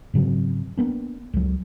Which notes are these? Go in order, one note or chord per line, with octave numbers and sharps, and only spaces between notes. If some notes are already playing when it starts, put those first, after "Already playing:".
G#2 C#3 F#3 C4
A#3 B3 D4
C#2 F#3